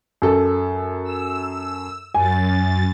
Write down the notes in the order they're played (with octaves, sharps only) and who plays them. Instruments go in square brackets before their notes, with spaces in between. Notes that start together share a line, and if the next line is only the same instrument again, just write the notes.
[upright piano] F#2 A4
[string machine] E6
E6
[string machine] F#2 A6 [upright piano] G#5